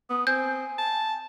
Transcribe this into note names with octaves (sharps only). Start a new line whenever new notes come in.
B3 D#6
C4 G#5 G6
A5